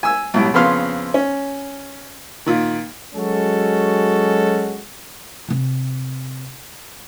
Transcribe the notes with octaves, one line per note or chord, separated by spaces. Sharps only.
G#5 E6
B1 A2 G3
F2 C#3 B3 F5 C6 F6
C#4
A#2 D#3
F#3 G#3 C#4 F#4 A4
C3 C4